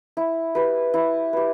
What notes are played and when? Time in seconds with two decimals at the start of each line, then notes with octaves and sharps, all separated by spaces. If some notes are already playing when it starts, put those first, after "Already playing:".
0.17 E4
0.55 G4 B4
0.94 E4
1.33 G4 B4